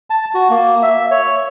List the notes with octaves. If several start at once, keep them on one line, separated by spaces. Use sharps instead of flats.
A5
F#4
A#3
E5
C#5